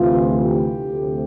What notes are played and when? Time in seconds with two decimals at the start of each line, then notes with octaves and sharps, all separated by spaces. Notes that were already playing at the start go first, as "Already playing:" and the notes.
Already playing: D2 C3 E3 F4
0.35 G4
0.89 D2 C3 F3 A3